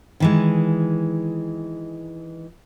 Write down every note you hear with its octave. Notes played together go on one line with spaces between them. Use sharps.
D#3 E3 G#3